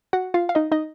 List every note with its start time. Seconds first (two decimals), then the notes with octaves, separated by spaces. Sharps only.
0.13 F#4 F#5
0.34 F4 F5
0.49 F5
0.55 D#4 D#5
0.72 D#4 D#5